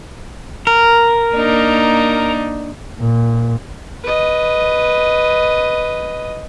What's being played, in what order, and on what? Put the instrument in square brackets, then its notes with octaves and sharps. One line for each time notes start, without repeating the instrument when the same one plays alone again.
[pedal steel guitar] A#4
[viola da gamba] A#3 D4 D#4
[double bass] A#2
[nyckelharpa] B4 D#5